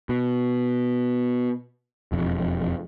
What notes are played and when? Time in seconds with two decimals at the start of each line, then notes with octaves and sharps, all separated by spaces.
0.09 B2
2.12 E1 F2